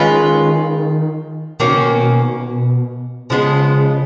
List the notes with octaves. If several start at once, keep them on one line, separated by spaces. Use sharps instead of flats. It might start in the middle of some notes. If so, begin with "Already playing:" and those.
Already playing: D#3 G#3 C#4 F4 B4
B2 D#3 A#3 C#4 F#4
C#3
B2
C#3 F3 G#3 B3